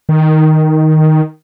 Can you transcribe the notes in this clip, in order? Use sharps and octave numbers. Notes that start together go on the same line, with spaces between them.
D#3